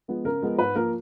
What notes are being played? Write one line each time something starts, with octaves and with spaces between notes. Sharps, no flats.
F3 G#3 B3
C#3 A#4
F3 G#3 B3
G#2 B4
F3 A#3 A#4